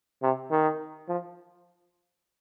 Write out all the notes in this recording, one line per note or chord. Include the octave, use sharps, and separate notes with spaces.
C3
D#3
F3